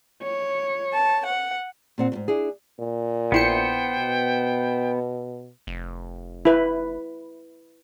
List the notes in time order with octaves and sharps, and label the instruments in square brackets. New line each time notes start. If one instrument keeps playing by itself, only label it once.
[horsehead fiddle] C#5
[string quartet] A5
F#5
[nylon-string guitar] A#2 C4 F#5
E2 G#2
D4 E4 G#4
[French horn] A#2
[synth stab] A#1 E4 C#7 [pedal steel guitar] B3 C5 [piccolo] G5
[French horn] B2
[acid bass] F1
[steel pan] E4 B4